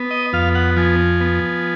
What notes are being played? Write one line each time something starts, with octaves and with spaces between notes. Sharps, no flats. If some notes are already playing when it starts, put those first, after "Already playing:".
Already playing: B3
D#5
F2 F5
F#5
F3 G#5
B3